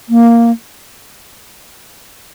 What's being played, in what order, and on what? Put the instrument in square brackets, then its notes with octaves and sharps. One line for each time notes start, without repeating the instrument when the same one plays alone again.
[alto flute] A#3